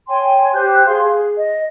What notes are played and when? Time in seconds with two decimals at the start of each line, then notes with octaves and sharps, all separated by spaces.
0.08 C#5 G5 G#5 C6
0.53 G4 C5 F#6 G6
0.87 G#4 F5 C6
1.02 G#4
1.36 D#5